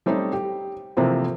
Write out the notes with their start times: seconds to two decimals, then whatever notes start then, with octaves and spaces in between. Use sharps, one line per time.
0.06 G3 A3 C4 C#4 D#4
0.33 G4
0.97 C3 E3 F3 A3 A#3 C4